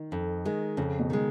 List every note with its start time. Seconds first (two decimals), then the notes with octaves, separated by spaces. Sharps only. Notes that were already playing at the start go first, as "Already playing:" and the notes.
Already playing: D#3
0.12 F2
0.45 D#3 G#3
0.77 F2 C#3
0.99 B2
1.10 D#3 G#3